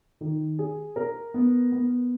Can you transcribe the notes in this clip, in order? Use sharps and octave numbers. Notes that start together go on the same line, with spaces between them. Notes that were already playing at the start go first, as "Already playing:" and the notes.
D#3
G#4
A#4
B3
B3